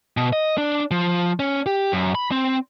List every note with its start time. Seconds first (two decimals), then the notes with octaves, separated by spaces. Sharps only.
0.17 B2
0.33 D#5
0.58 D4
0.91 F3
1.40 C#4
1.66 G4
1.92 F#2
2.15 B5
2.31 C4